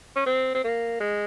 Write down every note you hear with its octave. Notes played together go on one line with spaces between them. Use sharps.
C#4
C4
C4
A#3
G#3